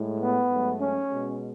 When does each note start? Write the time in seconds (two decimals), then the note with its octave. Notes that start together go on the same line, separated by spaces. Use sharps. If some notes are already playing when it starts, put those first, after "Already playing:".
Already playing: A2 G#3
0.20 B3
0.49 G#2 F#3 A3
0.78 C#4
1.08 B2 G#3